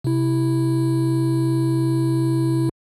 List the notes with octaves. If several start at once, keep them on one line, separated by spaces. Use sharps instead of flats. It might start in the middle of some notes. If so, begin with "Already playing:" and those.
C3 E4